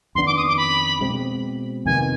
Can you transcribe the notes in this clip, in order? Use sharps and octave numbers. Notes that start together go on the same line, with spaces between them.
F2 D#3 B3 D4 C6
D6
D#6
D6
B5
B2 G#3 C4
F2 C3 D#3 B3 G#5